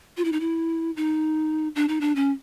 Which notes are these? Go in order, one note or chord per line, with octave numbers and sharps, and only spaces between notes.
F4
E4
D#4
E4
D#4
D4
D#4
D4
C#4